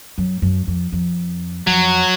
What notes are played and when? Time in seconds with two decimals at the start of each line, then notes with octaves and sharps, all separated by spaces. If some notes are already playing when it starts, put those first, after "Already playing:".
0.18 F#2
0.42 F#2
0.67 F2
0.92 F2
1.67 F2 F#3